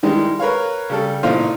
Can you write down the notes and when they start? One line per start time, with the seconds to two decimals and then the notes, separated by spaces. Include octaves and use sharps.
0.03 D#3 E3 G3 G#3
0.39 A#4 B4 C#5 F5
0.89 C#3 G3 A4
1.23 A1 A#2 D#4 F4 C5 F5